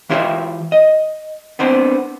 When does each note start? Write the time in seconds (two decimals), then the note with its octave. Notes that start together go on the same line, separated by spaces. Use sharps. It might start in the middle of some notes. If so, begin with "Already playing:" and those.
0.09 E3 E4 F4 G4 C#5 E5
0.72 D#5
1.59 B3 C4 D4 C5